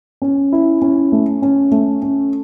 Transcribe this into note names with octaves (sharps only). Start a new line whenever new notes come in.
C#4
E4
C#4
A3
C#4
A3
C#4